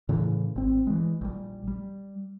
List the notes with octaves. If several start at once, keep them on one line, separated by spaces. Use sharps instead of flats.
A2 C#3 E3
G#1 C4
E3 G#3
A#1 G3
G3